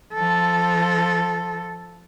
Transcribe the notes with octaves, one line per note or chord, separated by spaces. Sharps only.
F3 A4